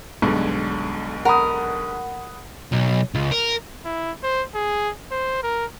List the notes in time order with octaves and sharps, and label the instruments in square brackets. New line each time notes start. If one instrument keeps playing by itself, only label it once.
[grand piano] B1 [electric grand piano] G2 D3 G#3
[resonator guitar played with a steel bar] A#4 [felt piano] F#5 B5 D#6
[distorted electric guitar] B1
C#2
A#4
[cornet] E4
C5
G#4
C5
A#4